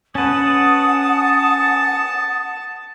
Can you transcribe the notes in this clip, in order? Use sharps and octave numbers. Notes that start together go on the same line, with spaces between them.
C#4 B4 F#5 A5 D#6